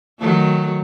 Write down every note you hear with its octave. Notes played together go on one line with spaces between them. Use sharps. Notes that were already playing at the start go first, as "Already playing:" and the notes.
D#3 F#3 A3